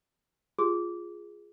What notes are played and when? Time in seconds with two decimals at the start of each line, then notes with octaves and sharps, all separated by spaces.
0.59 F4 G4 G#4 C6